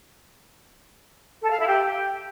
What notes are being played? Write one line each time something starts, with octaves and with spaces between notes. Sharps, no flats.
A4
F5
E4
G4